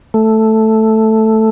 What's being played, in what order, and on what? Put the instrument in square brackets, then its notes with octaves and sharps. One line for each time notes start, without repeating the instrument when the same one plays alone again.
[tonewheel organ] A3